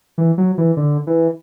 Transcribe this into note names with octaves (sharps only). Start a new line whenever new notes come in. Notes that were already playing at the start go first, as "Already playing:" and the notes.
E3
F#3
E3
D3
E3